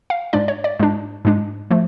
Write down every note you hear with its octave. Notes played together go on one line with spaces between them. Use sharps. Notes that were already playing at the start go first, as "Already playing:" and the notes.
F5
G#2 G#3 D4 D5
C#5
D5
G#2 G#3 D4
G#2 G#3 D4
F3 A3